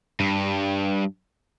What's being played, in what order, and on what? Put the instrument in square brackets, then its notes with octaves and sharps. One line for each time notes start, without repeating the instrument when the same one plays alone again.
[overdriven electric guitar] G2